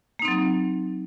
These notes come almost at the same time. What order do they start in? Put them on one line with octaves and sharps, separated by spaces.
A#3 D#4 C4 F#3